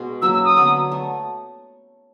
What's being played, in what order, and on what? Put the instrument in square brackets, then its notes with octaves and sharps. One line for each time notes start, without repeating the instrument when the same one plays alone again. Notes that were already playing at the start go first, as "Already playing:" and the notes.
Already playing: [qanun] B2 G#3
[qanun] F#3 A#3 C#4 [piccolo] E6
[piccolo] E6
D#6
[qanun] D3 F#3 B3
A3